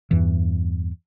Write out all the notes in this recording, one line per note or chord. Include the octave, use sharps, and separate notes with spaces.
E2 G2 E3